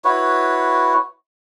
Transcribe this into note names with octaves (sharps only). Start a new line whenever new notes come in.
E4 F#4 B4 C#5